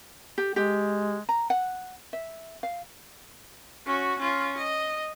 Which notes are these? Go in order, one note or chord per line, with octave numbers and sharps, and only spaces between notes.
G4
G#3 G4
A#5
F#5
E5
F5
C#4 F#4
C#4 F4
D#5